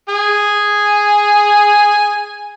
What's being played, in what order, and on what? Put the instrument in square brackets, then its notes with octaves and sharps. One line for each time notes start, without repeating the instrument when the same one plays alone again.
[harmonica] G#4 G#5